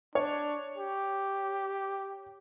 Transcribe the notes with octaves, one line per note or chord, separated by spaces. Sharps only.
D4 C#5
G4